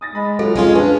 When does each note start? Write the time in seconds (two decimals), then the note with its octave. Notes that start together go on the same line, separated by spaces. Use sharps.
0.01 D#6 A6 A#6
0.15 G#3 B5
0.39 F#3 F4 F#4 A4
0.56 F2 F3 G#3 C#4 F4 G#4
0.75 C#4 D4 B4